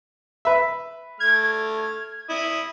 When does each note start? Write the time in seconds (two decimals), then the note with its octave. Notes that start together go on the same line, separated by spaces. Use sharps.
0.45 B4 E5
1.20 A3 F6 G#6
2.29 E4 D#6